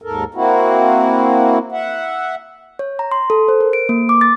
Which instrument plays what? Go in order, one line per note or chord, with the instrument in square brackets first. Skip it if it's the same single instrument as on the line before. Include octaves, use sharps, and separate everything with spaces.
[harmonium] D#2 G#2 A4 A#4
A#3 C4 E4 F#4
E5 F#5
[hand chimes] C#5
A#5
C6
A4
C5
A#4
D7
A#3
D6
A6